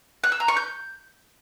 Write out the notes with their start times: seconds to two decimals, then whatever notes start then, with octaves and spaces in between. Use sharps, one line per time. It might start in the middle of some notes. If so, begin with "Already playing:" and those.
0.24 F#6
0.32 E6
0.40 A#5
0.48 C#6
0.57 G6